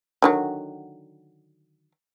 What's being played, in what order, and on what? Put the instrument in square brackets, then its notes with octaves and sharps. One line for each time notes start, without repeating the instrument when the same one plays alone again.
[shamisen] D3 D#3 F#3